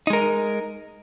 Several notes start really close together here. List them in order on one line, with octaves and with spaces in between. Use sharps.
D#4 G#3 A#4